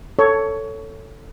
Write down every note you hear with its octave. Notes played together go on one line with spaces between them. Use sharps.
A4 C#5